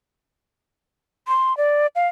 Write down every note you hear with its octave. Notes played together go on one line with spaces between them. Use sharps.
C6
D5
F5